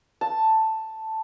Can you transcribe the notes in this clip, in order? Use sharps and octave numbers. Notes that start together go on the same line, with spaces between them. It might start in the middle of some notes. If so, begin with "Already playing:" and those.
A5